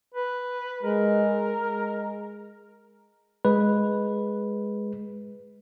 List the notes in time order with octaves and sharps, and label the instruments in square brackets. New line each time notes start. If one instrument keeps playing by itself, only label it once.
[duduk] B4
[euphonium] G#3 [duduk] A#4
[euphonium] G#3
[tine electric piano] G#3 B4